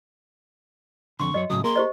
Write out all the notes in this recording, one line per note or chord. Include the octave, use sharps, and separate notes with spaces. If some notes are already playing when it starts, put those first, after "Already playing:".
F2 G#2 D3 C6 C#6
F#2 F#3 C#5 D#5
A2 C#3 F#3 D#6
A#3 G#4 A#4 C6
G4 C5 D#5